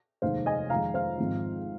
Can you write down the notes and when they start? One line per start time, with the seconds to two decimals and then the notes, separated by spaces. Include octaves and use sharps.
0.22 F1 D#2 D#3 G#3 D#4 C5 F5
0.46 D#5 G#5
0.70 F2 D#3 G#3 F5 A#5
0.94 C5 F5
1.18 G#1 G#2 F3 C4